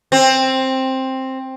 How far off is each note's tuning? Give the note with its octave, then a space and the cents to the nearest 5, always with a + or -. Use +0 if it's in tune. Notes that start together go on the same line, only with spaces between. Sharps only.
C4 +10